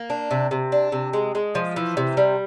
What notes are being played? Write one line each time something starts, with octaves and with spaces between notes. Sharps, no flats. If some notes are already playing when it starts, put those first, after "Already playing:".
Already playing: A#3
D4
C3
C3
D4
C3
G#3
G#3
F3
E3
C3
G3